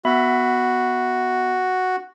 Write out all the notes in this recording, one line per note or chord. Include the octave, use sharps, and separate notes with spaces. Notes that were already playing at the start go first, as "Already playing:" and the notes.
B3 F#4 E5 B5